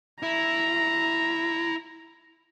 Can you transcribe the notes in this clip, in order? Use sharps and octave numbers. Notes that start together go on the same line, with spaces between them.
E4 A#5